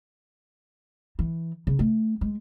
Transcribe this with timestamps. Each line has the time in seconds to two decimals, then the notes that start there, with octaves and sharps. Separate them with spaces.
1.19 E3
1.67 C#3
1.79 A3
2.21 G#3